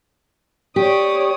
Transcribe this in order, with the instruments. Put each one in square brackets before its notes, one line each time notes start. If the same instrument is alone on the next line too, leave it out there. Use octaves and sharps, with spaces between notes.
[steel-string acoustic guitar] G4 [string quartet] C#5 D5 D#6